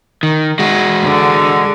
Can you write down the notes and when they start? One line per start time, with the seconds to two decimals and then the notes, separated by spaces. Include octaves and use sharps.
0.23 D#3
0.59 G#3 F#4
1.04 D3